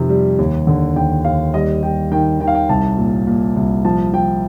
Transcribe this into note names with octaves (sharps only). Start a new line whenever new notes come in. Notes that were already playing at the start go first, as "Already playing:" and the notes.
Already playing: F2 C3 D#3
G3
D#2
D3
D#2 G5
D#2 F5
G3 D#5
G3 G5
D#3 G5
D#3 G5
F5
G5
C2 A5
A#2
A#2
C2
F3 A5
F3 G5